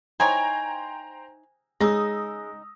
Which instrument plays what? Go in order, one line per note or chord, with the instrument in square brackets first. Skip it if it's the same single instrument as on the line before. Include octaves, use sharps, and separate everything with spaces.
[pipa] D#4 E4 C#5 [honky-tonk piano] C5 G5 A#5 [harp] G#5
[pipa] C#3 D#4 [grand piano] G#3 [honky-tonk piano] D#6 E6 A#6